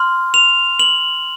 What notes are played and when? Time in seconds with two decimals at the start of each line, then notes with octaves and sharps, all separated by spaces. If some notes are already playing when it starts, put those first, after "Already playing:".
Already playing: C6 F6
0.34 F7
0.79 F#7